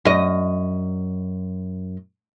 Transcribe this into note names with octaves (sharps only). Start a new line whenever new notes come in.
F#2 D#5